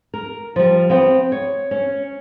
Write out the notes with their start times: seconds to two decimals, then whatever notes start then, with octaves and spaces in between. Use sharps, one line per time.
0.14 A#4
0.56 F3 G3
0.90 B3 C4 G5
1.32 C#5
1.71 C#4